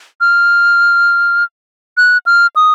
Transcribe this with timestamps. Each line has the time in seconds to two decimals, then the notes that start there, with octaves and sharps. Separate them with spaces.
0.21 F6
1.97 F#6
2.26 F6
2.56 D#6